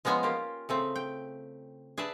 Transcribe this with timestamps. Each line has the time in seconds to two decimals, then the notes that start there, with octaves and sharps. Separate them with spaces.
0.05 F3 G#3 B3 C#4 G#5 A#5
0.23 A#3 F4 G4
0.69 C#3 A3 C4
0.96 G5
1.98 G#4 B4 D5 E5 G#5 A5